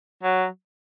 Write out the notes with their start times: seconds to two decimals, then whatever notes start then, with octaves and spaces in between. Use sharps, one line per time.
0.23 F#3